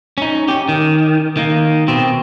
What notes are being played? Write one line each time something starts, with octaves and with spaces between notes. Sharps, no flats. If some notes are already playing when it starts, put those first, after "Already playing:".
C#4 D#4
C#4 G4
D#3
D#3 A#3
B2 C4